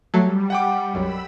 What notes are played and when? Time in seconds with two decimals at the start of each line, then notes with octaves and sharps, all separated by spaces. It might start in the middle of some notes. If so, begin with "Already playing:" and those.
0.14 F#3 G3 A3 A4
0.50 F#5 G5 D6
0.94 B1 F#2 B5 E6